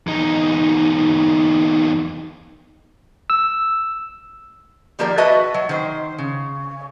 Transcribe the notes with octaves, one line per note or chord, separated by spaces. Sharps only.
E2 D#4
E6
D#3 F3 A#3 G4 A#4 D5
F#4 B4 D#5 E5 A5
F#3
D#3 C5
C#3